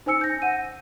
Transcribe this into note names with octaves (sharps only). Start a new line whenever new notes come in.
D#4 C5 G#5 E6 C#7
G6 A#6
F#5 D#7